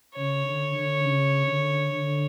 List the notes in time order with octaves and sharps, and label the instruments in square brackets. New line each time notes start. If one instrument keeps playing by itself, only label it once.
[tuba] C#3 [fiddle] C#5
[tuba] D3
D3
C#3
D3
D3